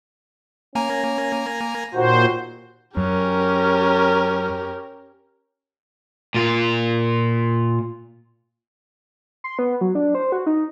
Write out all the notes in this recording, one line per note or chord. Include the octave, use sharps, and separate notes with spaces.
A#3 C#4 G#5 A#5
D#2 A#2 F#4 C5
F#2 C#4 G4 A#4
A#2 F4
C6
B3
F#3
D4
C5
F#4
D#4